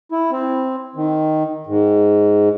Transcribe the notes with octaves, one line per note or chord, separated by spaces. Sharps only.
E4
C4
D#3
G#2